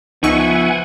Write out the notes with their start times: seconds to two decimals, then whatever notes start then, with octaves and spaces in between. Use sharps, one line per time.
0.23 C#2 F3 B3 D#4 E5 F#5 G#5 C#6